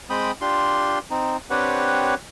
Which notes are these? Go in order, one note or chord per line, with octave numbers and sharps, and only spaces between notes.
G#3 C4 G5 B5 D#6
D4 F4 G4 C6
C4 D#4
C4 D4 G4 B4 C#5 F#5